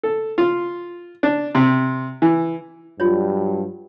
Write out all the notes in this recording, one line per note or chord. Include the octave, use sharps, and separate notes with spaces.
A4
F4
D4
C3
E3
G2 F#3 G3 F4 C#5